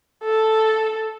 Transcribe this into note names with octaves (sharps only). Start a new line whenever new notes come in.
A4